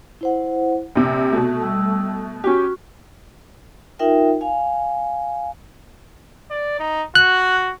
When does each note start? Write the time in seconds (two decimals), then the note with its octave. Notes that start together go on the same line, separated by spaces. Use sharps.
0.21 E4 C5 F#5
0.95 A#1 C3 G4
1.32 B2 A3 F#4
1.62 G3 E6
2.44 C#4 F#4 G4 C#6
3.99 D#4 F4 A#4 E5 G5
4.41 F5 G#5
6.50 D5
6.79 D#4
7.15 F#4 F#6